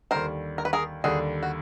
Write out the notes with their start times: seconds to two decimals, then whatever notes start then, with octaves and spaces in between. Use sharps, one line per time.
0.11 D#2 D3 G3 A#4 C5
0.58 A#4
0.65 B4
0.73 G#4 A#4
1.04 D#2 D3 G3 F#4 G#4
1.43 F#4